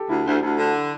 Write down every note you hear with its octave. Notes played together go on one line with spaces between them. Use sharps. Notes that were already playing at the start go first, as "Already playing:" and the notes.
Already playing: G4 A4
D2 E4
D2
D2
D3